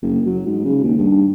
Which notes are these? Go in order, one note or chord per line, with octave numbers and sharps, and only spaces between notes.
F#1
F#3
G#2
C#3
D#2
G2